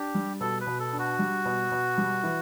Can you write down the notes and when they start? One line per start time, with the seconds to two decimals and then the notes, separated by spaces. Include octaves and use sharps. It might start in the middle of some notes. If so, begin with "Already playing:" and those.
Already playing: D4 G4
0.15 G3
0.40 B2 A4
0.61 B4
0.67 B2
0.80 A4
0.93 D4
0.99 F#4
1.19 G3
1.45 B2
1.72 B2
1.98 G3
2.23 E3